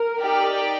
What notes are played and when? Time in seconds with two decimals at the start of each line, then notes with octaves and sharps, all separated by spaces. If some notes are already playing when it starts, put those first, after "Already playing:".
Already playing: A#4
0.20 D#4 G4 D5 G5